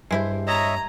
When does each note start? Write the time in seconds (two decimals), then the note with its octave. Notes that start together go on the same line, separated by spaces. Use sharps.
0.11 G2 G3 G#3 E4 C5
0.47 C#5 D#5 E5 A#5